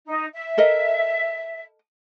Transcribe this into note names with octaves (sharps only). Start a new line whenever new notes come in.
D#4
E5
A4 A#4 D#5